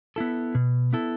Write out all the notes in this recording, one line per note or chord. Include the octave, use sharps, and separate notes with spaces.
B3 E4 A4
B2
B3 E4 A4